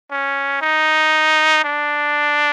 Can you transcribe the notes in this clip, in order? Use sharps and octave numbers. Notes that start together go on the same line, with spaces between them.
C#4
D#4
D4